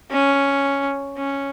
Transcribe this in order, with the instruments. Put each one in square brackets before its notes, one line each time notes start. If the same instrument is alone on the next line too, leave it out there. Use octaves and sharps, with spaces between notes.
[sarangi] C#4
C#4